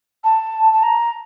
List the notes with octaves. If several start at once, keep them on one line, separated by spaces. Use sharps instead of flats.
A5
A5
A#5